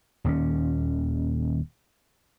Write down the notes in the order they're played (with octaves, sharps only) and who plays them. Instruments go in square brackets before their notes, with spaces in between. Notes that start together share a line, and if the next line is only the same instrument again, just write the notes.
[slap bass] D#1 D#2 F3 C#4